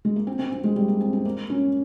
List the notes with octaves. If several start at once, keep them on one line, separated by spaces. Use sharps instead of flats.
G#3
A#3
C4
C4
C4
G#3
G3
A#3
C4
C4
A#3
C#4